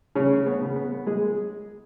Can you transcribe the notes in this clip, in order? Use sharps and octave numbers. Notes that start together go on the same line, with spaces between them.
C#3 C#4
B3
C#3
B3
G#3 G#4